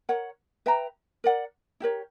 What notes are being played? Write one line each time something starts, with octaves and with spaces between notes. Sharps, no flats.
A#4 C#5 F#5
B4 E5 G5 A#5
A#4 D5 F#5
E4 G4 A#4 C#5